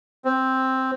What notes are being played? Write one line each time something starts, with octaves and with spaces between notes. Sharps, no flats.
C4